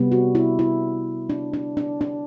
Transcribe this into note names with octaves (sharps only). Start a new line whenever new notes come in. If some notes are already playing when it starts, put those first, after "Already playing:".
Already playing: C3 G3 B3
F#4
E4
E4
D4
D4
D4
D4